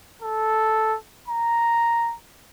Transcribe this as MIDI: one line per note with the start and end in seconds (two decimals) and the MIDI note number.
0.22 0.96 69
1.28 2.15 82